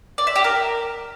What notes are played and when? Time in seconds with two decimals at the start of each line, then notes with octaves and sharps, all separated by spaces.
0.18 D5
0.27 E5
0.36 G4
0.44 A#4